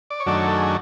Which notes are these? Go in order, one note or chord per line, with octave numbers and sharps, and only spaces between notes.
D5
C#5
F#2 D#3 F#3 A3 D4 D5
C#5
A4
G#4